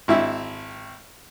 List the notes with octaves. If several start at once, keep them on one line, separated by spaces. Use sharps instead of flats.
G#1 E4 E5